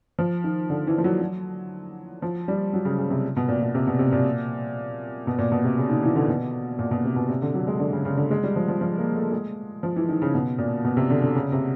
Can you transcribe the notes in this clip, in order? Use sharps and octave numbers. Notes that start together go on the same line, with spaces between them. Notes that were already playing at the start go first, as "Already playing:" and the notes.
F3
D#3
D3
E3
F3
F#3
F#3
F3
G3
F#3
C#3
C#3
C3
B2
A#2
B2
C3
B2
C3
A#2
B2
A#2
B2
C3
C#3
D#3
E3
D3
B2
A#2
B2
C3
B2
C3
D3
F#3
G#3
D3
C#3
C#3
D3
G#3
G3
F3
F3
F3
A#3
A3
G#3
F3
E3
D#3
C#3
B2
A#2
B2
C3
D3
D3
C#3
C3